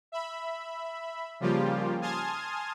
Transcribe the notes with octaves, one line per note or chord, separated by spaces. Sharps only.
E5 B5
C#3 F3 G3 A#3 F4 G4
G#5 A5 C6 D#6 F6 G#6